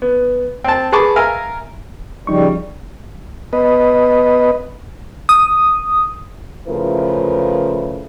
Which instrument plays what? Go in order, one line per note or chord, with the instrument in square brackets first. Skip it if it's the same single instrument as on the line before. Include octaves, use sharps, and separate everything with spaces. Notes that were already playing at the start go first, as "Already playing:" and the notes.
[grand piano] B3
[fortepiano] C4 A5
G#4 B4 A5 C#6 D6
A#4 E5 F5 G#5 A#5
[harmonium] C#3 G3 [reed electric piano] F3 D#4 C#6
[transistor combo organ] B3 B4 D#5
[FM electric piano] D#6
[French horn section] C#3 F3 A3 E4 A#4 B4